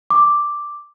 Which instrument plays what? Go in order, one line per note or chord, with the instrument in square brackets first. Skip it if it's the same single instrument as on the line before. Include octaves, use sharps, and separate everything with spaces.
[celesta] D6